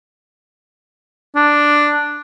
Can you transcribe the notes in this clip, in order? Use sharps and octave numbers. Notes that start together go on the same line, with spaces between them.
D4